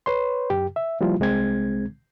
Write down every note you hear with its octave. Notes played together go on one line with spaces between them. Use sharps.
B4 C#5 C6
F#2 G4
E5
F3 G3 A#3 E4 F4
C2 G#3 C4 G#6